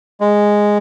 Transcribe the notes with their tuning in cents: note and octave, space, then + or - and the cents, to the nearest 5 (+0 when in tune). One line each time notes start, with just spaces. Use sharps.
G#3 -5